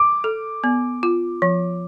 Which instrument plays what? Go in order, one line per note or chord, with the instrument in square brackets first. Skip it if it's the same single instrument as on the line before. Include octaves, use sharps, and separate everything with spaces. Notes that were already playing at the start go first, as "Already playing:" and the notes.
Already playing: [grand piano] D6
[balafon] A4
B3
F4
F3